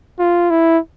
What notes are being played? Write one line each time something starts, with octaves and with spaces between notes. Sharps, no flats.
F4
E4